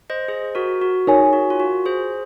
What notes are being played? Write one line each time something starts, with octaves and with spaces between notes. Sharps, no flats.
C5 D#5
G#4 C5
F#4 A#4
F#4
D#4 G#4 A#4 C#5 G#5
F#4
F4
F#4
G#4 C5